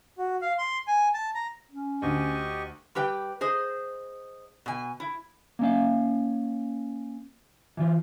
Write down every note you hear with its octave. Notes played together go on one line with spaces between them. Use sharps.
F#4
F5
C6
G#5
A5
A#5
C#4
D2 G4 D#5 C#6
G3 G4 B4 G5
G#4 C5 D#5
B2 G#5
E4
A#3 C#4 F5
E3 F4